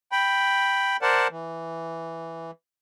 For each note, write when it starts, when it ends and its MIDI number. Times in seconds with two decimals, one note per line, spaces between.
0.12 0.97 79
0.12 0.97 83
1.02 1.27 70
1.02 1.27 72
1.02 1.27 74
1.02 1.27 78
1.02 1.27 81
1.31 2.51 52